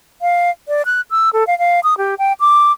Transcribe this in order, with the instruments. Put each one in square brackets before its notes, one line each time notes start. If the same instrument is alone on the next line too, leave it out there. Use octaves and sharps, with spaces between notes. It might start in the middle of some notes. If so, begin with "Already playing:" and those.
[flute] F5
D5
F#6
E6
A4
F5
F5
D#6
G4
G5
D6